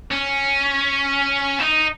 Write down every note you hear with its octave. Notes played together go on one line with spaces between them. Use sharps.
C#4
D#4